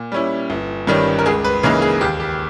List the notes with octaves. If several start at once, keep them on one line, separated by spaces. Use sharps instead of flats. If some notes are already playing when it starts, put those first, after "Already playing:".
Already playing: A#2
G3 C#4 E4
G1
G2 D#3 G3 C#4
A#4
C#2 G#4
B4
C#3 E3 A#3 D#4 A#4
G#4
D#2 G4
G4